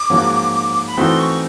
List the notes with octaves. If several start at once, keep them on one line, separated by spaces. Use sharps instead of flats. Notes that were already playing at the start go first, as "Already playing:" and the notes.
Already playing: D6
G#2 F3 A#3 C#4 F#4
B5
E3 A3 C4 D#4 F#4 C6
C#6